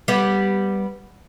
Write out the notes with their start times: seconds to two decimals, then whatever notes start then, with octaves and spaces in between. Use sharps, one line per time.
0.08 G3 B3